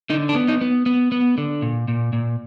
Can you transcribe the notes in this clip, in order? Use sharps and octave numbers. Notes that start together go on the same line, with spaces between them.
D3 D#4
D4
B3
D#4
B3
B3
B3
D3
A#2
A#2
A#2